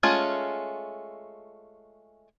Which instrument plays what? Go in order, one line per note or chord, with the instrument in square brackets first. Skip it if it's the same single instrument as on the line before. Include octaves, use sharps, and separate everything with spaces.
[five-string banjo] G#3 A3 C#4 F4